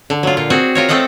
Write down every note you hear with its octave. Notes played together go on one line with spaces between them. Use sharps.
D3
F#3 F4
A#2 F4
C4 F#4 G#4
F4 A#4 C#5
A3 C4 A4 D#5 F#5